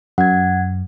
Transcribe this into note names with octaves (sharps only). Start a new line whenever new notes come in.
F#2 F#5 G#6